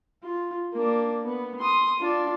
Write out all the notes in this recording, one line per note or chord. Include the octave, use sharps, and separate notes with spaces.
F4
A#3 D4
B3
C6 D#6
D4 F4